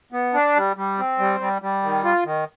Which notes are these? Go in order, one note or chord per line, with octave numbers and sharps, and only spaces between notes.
B3
D4
G3
G3
C4
G3
G3
G3
D#3
F4
D#3